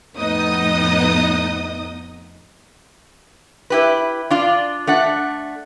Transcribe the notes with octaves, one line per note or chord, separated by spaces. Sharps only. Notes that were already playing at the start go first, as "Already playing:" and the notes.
F2 A2 B3 D#4 D#5 D#6
E4 G4 B4
D4 F4 D5
A3 D4 F#5